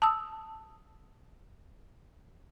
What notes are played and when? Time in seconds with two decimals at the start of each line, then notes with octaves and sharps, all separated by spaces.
0.02 A5 D#6 E6